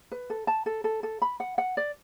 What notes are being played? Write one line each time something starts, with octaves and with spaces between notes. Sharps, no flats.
B4
A4
A5
A4
A4
A4
B5
F#5
F#5
D5